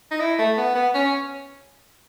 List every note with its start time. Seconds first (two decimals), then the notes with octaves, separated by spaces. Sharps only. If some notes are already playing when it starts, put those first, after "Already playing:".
0.11 D#4
0.20 E4
0.38 A3
0.57 B3
0.75 B3
0.94 C#4